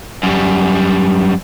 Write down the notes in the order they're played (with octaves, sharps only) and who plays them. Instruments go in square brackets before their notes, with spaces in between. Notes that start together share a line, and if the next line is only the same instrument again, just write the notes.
[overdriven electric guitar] F#2 G3